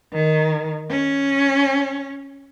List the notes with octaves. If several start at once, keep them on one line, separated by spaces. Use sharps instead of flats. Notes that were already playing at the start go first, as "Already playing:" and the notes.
D#3
C#4